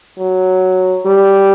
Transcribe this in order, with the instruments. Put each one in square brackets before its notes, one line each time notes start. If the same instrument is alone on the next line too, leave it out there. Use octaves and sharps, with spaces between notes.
[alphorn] F#3
G3